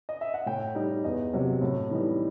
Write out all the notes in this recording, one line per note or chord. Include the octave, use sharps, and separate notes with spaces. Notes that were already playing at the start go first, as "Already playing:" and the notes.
D#5
E5
F#5
A2 G5
G3 D#4
E2 D#5
C3 F#3
A2
E3 G3 D#4